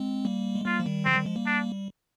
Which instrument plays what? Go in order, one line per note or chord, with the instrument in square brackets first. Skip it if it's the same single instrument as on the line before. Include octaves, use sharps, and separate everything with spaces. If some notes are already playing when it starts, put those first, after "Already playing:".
Already playing: [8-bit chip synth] G#3 C4
G3 A#3
G#3
[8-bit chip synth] G3 A#3 [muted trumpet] F4
[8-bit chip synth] F3
D#3 G3
[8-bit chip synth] D3 F3 [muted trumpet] C4
[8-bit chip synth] D#3 G3
F3 G#3
G3 A#3
[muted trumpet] D4